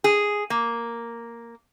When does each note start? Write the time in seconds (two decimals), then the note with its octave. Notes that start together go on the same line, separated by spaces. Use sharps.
0.04 G#4
0.50 A#3